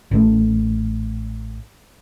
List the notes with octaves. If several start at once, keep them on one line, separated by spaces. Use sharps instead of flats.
A1 A#2 A3